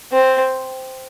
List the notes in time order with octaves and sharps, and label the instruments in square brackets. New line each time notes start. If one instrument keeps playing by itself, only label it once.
[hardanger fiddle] C4